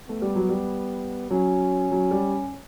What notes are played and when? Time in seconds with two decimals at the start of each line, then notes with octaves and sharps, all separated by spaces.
0.09 A3 B3
0.22 G3
0.36 F#3
0.49 G3
1.31 F#3 C#4
1.92 F#3
2.11 G3